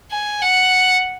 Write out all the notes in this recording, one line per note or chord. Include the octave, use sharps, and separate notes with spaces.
G#5
F#5